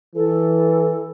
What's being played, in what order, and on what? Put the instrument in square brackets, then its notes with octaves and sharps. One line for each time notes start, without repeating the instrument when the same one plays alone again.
[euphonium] E3 [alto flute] A4